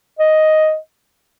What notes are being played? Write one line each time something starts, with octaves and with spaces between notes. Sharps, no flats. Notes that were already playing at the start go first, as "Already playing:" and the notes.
D#5